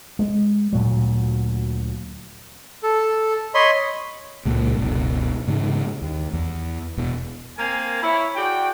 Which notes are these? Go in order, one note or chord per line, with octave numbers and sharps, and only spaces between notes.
G#3
D2 A#2 F#3
A4
C#5 D#5 B5 C6
C#2 A#2 A#3
F#1 C#2 B2
G#2 C#3 E3
D#2
E2
E1 B2
A#3 C4 A#4 F5 G#5
E4 C#5
F#4 G#4 D5 G5